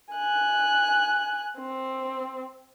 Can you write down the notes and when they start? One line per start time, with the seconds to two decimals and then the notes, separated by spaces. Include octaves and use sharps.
0.13 G#5 F#6
1.58 C4